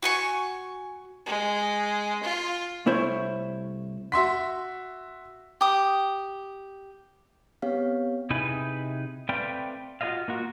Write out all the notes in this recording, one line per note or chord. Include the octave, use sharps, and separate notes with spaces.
F#4 G#5 C#6
G#3
F4
C2 A3 E4 C5 C#5
F#4 E5 C6 B6
G4 D#6
B3 C4 G4 C#5 F5
C3 D#4 E4 G#4 B4
A3 C4 B4 D5 F5 G5
F4 F#4 G#4 C5 D#5 F5
A#3 F4 F#4